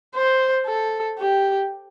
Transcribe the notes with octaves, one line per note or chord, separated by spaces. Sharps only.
C5
A4
G4